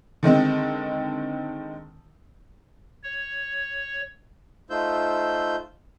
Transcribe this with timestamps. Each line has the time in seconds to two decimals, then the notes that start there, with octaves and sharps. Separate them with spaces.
0.23 D3 D#3 G#3 C4
3.03 C#5
4.70 A3 D#4 F4 C5 E6 G6